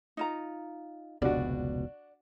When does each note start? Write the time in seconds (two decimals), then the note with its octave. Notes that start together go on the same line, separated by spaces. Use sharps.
0.17 D#4 F4 A#5
1.22 F1 C#2 B2 D4 F#4 D5